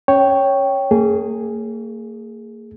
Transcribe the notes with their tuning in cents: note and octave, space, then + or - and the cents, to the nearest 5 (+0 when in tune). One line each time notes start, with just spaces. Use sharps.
C#4 +0 C#5 +0 G5 +0
A#3 -35 G#4 +0